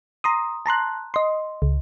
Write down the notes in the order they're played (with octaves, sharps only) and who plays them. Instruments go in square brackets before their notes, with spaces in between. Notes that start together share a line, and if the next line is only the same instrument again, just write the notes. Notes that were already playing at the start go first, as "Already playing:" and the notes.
[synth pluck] A#5 C6 D#6
A5 A#5 C6 F#6
D#5 C6
C#2